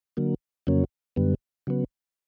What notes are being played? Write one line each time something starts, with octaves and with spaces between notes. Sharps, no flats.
D3 F#3 A#3
F2 C#3 F#3 A#3 C#4
F#2 D3 G3 B3
C#3 F#3 B3